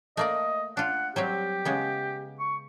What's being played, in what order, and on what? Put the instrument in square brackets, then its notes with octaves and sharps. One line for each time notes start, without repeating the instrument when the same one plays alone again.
[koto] A3 A#3 D5 [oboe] D#5
[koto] D4 F4 [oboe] F#5
[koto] F#3 G3 C4 [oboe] G4
[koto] C#3 G#3 B3
[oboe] C#6